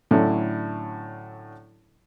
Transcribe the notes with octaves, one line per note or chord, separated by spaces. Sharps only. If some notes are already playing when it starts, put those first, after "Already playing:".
A2 D3 F#3 C#4 D4 E4